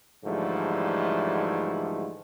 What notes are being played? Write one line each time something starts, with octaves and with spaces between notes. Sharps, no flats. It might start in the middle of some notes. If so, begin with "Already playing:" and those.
G#2 D3 E3 F3 G3 A3